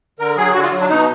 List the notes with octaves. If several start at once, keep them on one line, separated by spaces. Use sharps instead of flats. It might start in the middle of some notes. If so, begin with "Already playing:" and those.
D3 A#4
F#3 G#4
D3 F#4
F4
F#3
D4
B2 D#4